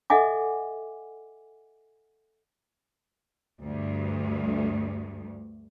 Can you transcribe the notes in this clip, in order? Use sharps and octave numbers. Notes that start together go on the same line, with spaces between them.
A4 D#5 E5 F#5 G#5 D6
D2 G2